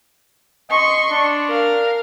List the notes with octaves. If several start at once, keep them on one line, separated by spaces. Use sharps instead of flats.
D#5 C6 C#6
D4
A#4 F5